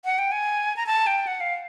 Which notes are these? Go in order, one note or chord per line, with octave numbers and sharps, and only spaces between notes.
F#5
G5
G#5
A#5
A5
G5
F#5
F5